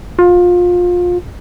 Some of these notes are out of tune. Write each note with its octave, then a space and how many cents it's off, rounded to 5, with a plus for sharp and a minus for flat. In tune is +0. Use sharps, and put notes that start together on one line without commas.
F4 +25